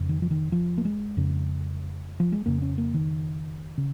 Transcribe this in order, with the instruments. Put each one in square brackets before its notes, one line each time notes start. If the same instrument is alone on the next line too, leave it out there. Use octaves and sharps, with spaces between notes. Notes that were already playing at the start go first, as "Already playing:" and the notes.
Already playing: [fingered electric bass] F2 C#3
D#3
F3
D#3
F3
A#3
G#3
F2 C#3
F3
G#3
F2 C#3 A#3
C#4
A#3
D#3
C#3